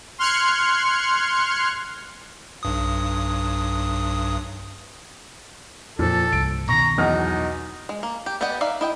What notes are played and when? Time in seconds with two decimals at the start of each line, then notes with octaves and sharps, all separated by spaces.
0.18 C6 F6 F#6 G#6 C#7
2.63 B1 G2 D#6
5.99 F2 A#2 F3 A4
6.33 C2 G2 D7
6.69 B2 D#3 A#5 C#6
6.98 B1 E2 D#4 F6
7.89 G#3
8.03 A#3
8.26 G4
8.41 B3 G4 D5 D#5 F#5
8.61 D#4 D5 E5 F5
8.81 E4 D#5 G5